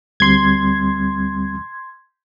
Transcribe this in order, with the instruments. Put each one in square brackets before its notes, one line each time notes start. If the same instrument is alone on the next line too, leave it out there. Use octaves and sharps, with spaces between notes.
[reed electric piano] D2 G3 C4 [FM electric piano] C6 G#6